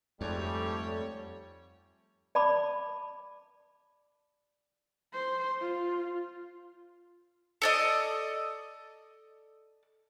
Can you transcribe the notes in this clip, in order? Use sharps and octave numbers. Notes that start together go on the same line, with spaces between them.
F2 G#2 G3 A3 C#5
D5 A5 B5 D6
C5
F4
A4 D5 D#5